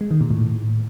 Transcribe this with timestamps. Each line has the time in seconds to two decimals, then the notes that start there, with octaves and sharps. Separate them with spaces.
0.01 G#3
0.11 D#3
0.21 A#2
0.31 A2